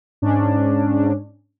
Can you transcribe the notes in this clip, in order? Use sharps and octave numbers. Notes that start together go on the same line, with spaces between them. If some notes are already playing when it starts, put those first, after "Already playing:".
G#2 C#4 D4